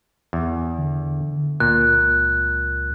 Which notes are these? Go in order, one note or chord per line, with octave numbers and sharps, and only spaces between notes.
E2
D3
C#2 A#2 F#6